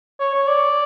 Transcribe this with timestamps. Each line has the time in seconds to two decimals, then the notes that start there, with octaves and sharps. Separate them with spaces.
0.20 C#5
0.34 C#5
0.47 D5